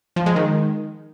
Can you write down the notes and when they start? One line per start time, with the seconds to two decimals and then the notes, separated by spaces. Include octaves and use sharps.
0.16 F3
0.26 G#3
0.36 D#3